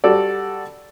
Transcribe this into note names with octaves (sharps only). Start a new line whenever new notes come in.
G3 F#4 A4 D5